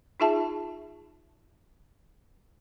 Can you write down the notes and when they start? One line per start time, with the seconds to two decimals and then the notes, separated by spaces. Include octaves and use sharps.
0.20 D#4 F4 G#4 E5 A5